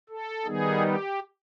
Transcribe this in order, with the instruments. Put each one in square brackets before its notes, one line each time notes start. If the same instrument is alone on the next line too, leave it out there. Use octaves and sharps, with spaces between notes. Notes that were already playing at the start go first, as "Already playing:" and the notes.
[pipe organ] A4
D#3 G3 B3 D#4 G#4
G4